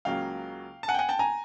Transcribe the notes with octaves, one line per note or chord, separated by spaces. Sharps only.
C#2 C#3 F#3 A#3 F5 G5
A5
F#5 G#5
G5
F#5 G#5
G5 A5
G#5 A#5